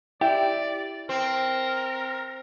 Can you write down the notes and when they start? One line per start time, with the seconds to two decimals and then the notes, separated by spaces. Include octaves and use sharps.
0.21 E4 G4 D5
1.09 C4 A#4